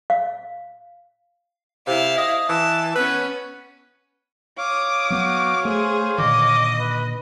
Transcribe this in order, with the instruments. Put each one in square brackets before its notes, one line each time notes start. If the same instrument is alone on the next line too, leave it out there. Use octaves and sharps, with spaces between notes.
[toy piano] F5
[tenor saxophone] C3 [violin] E4 F5
[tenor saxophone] D#5
[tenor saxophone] E3 [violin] A5
[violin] B3 C#4 [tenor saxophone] B4
[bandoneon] C#5 F5 [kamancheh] D6 D#6
[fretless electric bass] F#3 B3 [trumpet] F#4
[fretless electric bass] A3 [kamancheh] G#4 [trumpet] C5
[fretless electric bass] A#2 D3 D#3 [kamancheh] D#5 [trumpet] D6
[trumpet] B4